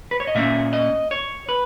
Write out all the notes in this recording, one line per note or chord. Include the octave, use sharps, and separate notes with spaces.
B4
C#5
D#5
A#2 A#3 C#4 E5
D#5
C#5
B4